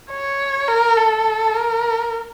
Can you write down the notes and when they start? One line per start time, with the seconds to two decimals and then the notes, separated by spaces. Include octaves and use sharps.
0.10 C#5
0.68 A#4
0.97 A4
1.54 A#4